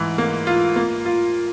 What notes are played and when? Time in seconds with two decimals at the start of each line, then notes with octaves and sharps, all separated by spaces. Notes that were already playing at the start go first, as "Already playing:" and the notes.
Already playing: G#2 E3
0.18 A#3
0.47 F4
0.76 A#3
1.06 F4